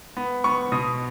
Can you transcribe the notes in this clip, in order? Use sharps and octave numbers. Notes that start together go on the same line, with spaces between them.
B3
B3 C#6
B2 D#6